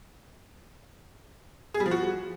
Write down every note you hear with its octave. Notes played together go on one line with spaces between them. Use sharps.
G#4
G3
F3
F#4